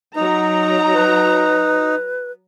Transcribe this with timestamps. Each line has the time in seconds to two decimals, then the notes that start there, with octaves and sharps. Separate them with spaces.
0.16 F#3 D#4 A#5
0.93 B4